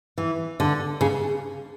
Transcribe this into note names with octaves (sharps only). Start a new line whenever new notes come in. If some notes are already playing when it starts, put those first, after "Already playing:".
E3
D3
C#3